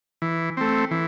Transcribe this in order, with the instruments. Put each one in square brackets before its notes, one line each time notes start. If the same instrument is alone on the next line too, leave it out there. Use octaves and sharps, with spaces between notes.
[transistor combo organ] E3
A3 C4
E3